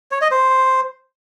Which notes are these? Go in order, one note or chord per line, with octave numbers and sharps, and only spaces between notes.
C#5
D#5
C5